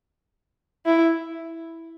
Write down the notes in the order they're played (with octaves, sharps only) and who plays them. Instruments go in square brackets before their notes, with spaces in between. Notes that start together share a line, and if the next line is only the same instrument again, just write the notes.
[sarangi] E4